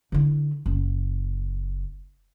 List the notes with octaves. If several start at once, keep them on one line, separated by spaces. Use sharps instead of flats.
D3 E4
F#1